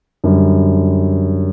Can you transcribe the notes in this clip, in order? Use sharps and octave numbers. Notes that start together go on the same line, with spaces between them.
F#2 D3 G3